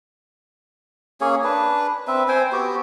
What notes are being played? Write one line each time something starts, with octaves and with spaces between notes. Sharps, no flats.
A#3 C#4 G#4 C#5
D4 B4
C4 B4 E5
C4 C5 G5 G#5
B3 F#4 G4